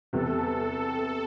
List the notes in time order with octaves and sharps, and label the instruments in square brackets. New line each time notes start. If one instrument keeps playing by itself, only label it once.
[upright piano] E2 C3 G3 B3 [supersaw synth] A4